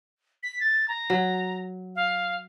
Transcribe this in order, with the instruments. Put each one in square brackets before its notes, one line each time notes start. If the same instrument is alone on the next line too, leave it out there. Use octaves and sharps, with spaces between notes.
[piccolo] B6
A6
A#5
[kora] F#3
[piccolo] F5